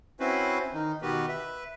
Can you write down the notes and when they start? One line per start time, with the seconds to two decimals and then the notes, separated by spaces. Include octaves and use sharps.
0.20 C4 C#4 E4 F#4 B4 C5
0.74 D#3 D#4
1.02 B2 D#3 B3 F#4 G4 B4
1.28 B4 E5